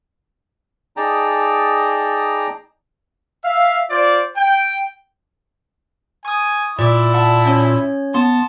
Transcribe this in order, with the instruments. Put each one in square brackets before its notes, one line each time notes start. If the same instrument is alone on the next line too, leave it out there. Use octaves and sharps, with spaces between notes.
[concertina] D#4 G#4 D5 G5 A5 A#5
[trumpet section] E5 F5
F4 C5 D5
G5
[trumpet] G#5 [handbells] C#6 D#6
[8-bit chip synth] A#2 [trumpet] E4 [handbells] D5 D6
[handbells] D5 F#5 A5
C#4 C#5
[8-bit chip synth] B3 C6 [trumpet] A5